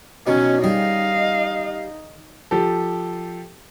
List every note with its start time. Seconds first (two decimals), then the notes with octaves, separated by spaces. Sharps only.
0.27 B2 D#3 F#3 C#4
0.64 D#3 G3 D#4 G#4 D#5 F5
2.51 F3 G4 A4